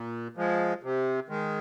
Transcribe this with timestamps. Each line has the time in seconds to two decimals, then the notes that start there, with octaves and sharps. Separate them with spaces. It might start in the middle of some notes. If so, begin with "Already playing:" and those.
Already playing: A#2
0.37 F3 G#3
0.83 C3
1.29 D#3 G#3